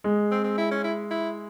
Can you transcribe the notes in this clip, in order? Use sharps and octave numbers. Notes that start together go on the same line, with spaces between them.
G#3
C4
C4
E4
C#4
E4
E4